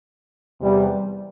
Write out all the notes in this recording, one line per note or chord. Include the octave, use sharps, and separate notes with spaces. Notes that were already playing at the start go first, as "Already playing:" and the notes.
E2 C3 E3 G3